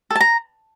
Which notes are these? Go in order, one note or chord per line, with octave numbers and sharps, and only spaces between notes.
A4
A5
A#5